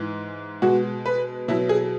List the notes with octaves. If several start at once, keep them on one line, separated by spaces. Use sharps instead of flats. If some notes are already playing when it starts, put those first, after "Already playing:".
Already playing: G#2 E3 G#3
B2 G#3 F#4
B4
B2 F#3 E4
G#4